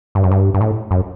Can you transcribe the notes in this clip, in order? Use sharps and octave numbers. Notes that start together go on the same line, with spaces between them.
G2
F#2
G2
G2
A2
F#2